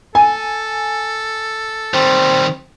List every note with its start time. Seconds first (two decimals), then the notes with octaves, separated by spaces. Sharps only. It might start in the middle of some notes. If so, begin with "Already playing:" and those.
0.15 A4 G#5
1.94 D#3 G3 C4